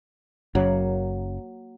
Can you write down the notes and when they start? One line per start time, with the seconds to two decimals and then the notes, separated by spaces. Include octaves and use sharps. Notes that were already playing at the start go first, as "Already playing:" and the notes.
0.55 F#1 F#2 C#3 F#3 A#3 F#5